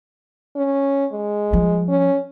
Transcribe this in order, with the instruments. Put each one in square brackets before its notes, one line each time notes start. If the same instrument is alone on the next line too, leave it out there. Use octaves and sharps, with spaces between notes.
[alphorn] C#4
G#3
[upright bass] F3 G3
[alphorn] C#4